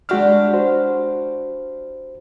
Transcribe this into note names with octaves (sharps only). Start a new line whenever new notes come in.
G#3 D4 E4 F#4 G4 F6
F#4 C5